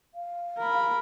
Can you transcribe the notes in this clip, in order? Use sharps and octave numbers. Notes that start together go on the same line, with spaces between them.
F5
A#4 B5